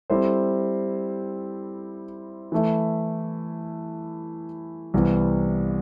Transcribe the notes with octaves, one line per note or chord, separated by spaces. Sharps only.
G3 C4 E4 A4 C5
E3 A3 E4
C2 C3 E3 B3